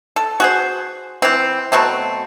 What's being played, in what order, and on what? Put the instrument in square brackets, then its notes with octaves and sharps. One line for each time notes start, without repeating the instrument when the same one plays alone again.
[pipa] A4
F#4 G#4 C5
E3 C4
B2 F#3 A3 C4